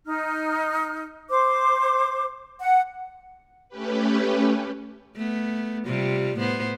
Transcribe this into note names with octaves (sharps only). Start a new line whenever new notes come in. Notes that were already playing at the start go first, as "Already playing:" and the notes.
D#4 F6
C5 D6
F#5
A3 C#4 G4 B4
A3 B3
C3 G3 F4
A2 B3 C5